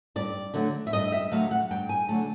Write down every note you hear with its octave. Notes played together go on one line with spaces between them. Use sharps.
G2 D5
D3 F#3 A3
E5
G2 D#5
E5
D3 F#3 A3 F5
F#5
G2 G5
G#5
D3 F#3 A3 A5